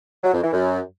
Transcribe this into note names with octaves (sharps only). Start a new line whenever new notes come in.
F#3
F2
E3
F#2